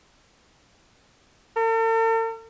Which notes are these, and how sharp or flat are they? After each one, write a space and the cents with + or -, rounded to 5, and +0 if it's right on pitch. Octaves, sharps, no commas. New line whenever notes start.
A4 +45